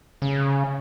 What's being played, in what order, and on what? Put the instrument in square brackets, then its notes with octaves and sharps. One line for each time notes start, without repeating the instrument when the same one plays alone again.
[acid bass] C#3